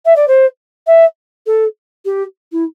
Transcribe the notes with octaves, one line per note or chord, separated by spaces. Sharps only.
E5
D5
C5
E5
A4
G4
E4